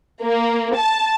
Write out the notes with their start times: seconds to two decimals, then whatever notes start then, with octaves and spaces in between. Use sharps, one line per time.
0.22 A#3
0.76 A5